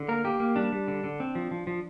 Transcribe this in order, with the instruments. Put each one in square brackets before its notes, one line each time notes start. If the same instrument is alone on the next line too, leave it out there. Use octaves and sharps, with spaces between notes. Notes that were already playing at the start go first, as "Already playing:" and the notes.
Already playing: [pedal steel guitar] D3
A#3 A#4
A#3 G4
A#3
G3 D4
G3
D3
D3
C4
F3
F3
F3